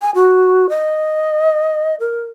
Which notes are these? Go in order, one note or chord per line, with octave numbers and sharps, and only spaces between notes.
G#5
F#4
D#5
A#4